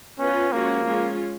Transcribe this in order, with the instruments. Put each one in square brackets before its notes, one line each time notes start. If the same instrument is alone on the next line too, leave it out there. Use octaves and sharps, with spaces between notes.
[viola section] B3 F4 B4 [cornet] C#4
[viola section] F3 G#3 C#4 F#4 [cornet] A#3
[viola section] G#3 C#4 F4